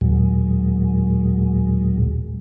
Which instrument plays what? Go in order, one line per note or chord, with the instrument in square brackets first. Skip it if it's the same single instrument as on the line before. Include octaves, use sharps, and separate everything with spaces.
[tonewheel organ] D#2 A#2 F#3 G#3